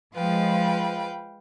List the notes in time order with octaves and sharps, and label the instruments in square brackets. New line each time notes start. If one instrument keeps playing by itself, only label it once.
[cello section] F3 G#3 [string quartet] B4 F5 G5